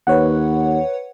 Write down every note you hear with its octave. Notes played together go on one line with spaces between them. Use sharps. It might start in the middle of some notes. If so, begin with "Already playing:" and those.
D#2 B4 C#5 F#5